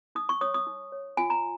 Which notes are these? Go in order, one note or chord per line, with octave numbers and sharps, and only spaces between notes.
D#4 D#6
C#6
C#5 D#6
D#6
D#4
C#5
F4 G#5
A#5